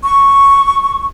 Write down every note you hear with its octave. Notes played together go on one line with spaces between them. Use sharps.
C#6